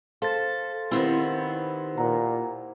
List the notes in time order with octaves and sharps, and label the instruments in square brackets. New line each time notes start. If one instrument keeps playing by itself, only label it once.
[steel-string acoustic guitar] A4 [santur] C5 [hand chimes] F5 A6
[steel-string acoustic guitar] D#3 B3 C4 [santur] E4 G4 C5
[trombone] A#2 [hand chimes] F#5 A#5